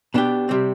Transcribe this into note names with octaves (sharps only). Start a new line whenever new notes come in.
B2 B3 D4 G4
C3 G3 C4